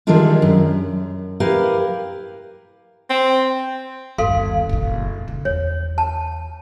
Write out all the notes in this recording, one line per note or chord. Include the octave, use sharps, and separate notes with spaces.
D#3 E3 G3 G#3 D4 F4
F#2
E4 G4 A#4 B4 F5
C4
G1 D#2 A4 F5 C6
F#1 A#2
C#3
E2 C#5
A5